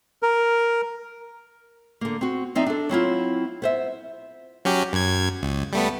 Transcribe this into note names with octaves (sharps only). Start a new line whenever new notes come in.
A#4
D3 A#3
C4 F#4
F3 C4 D#4 D5 E5
D4 A4
F#3 C4 E4 F4
B3 C5 E5
F#3 C#4 G4
F#2 G#6
C#2
G3 A3 B3